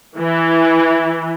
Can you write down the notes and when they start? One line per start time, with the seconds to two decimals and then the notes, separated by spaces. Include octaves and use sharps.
0.17 E3